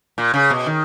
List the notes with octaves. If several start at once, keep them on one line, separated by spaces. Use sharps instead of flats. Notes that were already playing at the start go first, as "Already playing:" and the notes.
A#2
C#3
B2
D#3